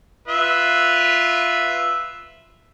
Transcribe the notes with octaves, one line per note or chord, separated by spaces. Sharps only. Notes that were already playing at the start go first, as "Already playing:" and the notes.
F4 B4 E5